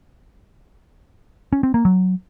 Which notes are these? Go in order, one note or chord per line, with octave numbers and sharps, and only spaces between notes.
C#4
C4
A#3
F#3